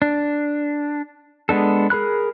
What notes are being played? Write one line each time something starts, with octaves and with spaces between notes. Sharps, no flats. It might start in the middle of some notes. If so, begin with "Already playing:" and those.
D4
G#3 B3 D4 A4
G#4 A#4 B5 F#6